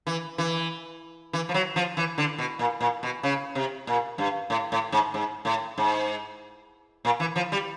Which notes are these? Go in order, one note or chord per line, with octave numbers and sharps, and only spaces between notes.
E3
E3
E3
F3
F#3
F3
E3
D3
B2
A#2
A#2
B2
C#3
C3
A#2
G2
A2
A2
G#2
G#2
A2
G#2
A#2
E3
F3
G3